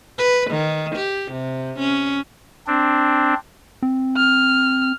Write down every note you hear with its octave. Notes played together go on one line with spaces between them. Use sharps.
B4
D#3
G4
C3
C#4
C4 D4
C4
F6